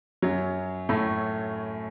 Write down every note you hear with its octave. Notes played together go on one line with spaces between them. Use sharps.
F#2 F#3
A2 A3